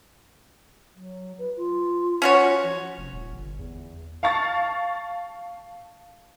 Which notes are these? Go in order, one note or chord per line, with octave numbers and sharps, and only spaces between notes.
F#3
B4
F4
C#4 F#4 C#5
F3
F1
D#1
G1
E2
F5 A5 C#6 A6